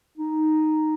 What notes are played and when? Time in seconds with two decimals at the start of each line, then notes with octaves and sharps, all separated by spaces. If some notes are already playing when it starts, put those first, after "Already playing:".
0.17 D#4